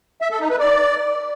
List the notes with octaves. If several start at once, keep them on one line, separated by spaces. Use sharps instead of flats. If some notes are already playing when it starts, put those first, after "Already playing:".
E5
A4
D#4
B4
D5